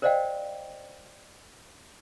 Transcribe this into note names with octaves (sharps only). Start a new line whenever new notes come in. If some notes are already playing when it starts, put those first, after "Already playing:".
A#4 C5 D5 D#5 F5 G5